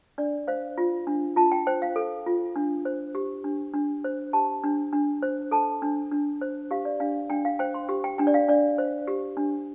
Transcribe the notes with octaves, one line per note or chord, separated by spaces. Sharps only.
D4 D5
C5 F5
F4
D4
F4 A5
G5
C5 G5
F5
A4
F4
D4
C5
G4
D4
D4
C5
G4 A5
D4
D4
C5
A4 A5
D4
D4
C5
G4 F5
D5
D4 F5
D4 G5
F5
C5 G5
C6
G4
G5
D4 G5
D5
F5
D4 D5
C5
G4
D4